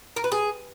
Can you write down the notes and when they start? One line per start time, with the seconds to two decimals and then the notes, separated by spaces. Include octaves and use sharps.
0.16 A#4
0.24 B4
0.32 G#4